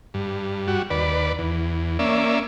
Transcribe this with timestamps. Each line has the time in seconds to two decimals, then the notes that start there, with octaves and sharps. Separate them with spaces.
0.14 G2
0.68 G3 F#4
0.90 D#2 B4 D5
1.39 E2
1.99 A#3 C#4 D5 E5